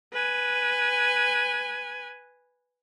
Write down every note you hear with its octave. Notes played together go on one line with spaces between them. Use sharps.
B4 G#5